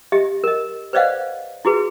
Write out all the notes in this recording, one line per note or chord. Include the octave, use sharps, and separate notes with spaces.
G4 D#5 E5
A#4 D#5
B4 C5 D5 D#5 F5 F#5
E4 F#4 G#4 B4